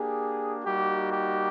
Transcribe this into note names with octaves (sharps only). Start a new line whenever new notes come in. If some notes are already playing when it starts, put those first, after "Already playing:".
Already playing: A#3 D4 G4 G#4
G3 A#3 D#4 F#4 G4
G4